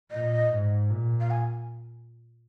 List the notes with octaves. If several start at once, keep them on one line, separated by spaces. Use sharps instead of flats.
A#2 D#5
G#2
A#2
F5
G#5